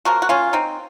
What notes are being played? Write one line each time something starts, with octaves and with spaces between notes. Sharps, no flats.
C#3 F3 A#3 F#4 A#4
F#4
C#4 F4
C4 D#4